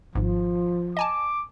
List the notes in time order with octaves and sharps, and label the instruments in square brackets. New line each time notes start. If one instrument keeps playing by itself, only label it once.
[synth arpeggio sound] G#1 G#2 [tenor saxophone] F3
[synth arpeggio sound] D#5 G#5 A5 [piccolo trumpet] D6